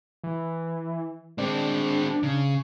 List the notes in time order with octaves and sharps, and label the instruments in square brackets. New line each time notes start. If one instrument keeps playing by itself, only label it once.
[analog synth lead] E3
[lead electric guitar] G#3 C4 [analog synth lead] D4
[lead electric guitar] C#3